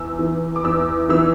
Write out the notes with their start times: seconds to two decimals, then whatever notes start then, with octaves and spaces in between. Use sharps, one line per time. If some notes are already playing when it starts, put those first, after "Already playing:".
Already playing: E2 E6
0.19 E3
0.56 D6
0.64 E2 E6
1.09 E3 E6